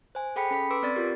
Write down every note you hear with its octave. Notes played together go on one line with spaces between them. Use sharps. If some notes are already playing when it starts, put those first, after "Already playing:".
C5 G#5
G#4 A4 G5 B5 B6 C#7
C#4 A4 B5 B6
B4 C6 D6 E6 B6 D7
C4 D5 A6
F4 G4 A#4